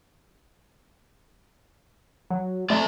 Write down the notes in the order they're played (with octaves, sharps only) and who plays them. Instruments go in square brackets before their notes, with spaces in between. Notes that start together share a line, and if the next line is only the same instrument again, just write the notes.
[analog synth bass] F#3
[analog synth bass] A3 [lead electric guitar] C4 D5